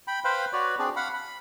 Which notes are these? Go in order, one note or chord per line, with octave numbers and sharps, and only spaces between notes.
G5 B5
B4 C5 F5 G5 B5
F#4 B4 C#5 D5
C4 D4 G#4 D5
F5 F#5 B5
B5